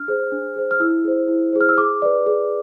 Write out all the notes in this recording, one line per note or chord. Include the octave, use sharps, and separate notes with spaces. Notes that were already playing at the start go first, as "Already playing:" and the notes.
Already playing: D4 F6
G#4 C5
D4
G#4 C5
F6
E4 E6
G#4 C5
E4
G#4 C5
F6
E6
G#4 D6
B4 D5
G#4